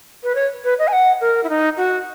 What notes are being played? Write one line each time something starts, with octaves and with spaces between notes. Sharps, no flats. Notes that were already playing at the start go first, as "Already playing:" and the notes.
B4
C#5
B4
D#5
G#5
F#5
A#4
E4
D#4
F#4